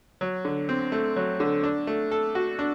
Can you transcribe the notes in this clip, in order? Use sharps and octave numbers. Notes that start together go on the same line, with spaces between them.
F#3
D3
C4
A3
F#3
D3
D4
A3
A4
F#4
D4